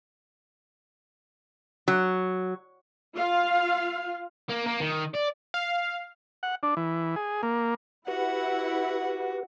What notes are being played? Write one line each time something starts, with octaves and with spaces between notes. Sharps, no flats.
F#3
F4 F5
A#3
A#3
D#3
D5
F5
F#5
D4
E3
G#4
A#3
E4 F#4 G4 B4 F#5